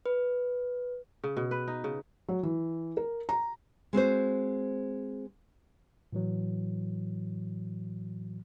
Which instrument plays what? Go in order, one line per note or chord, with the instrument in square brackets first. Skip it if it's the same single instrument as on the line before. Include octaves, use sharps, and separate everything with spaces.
[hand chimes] B4
[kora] C#3
B2
B4
D#4
C#3
[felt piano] F#3
E3
A#4
A#5
[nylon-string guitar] G#3 C4 F#4 C5
[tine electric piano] A2 E3 F#3